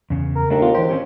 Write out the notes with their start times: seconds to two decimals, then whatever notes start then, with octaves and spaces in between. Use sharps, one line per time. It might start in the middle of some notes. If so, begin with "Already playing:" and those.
0.10 E2 C#3
0.36 A#4
0.50 D#2 A3 D4 A#4
0.62 B3 F4
0.75 E3 G4 C5
0.89 C4 C#4 G4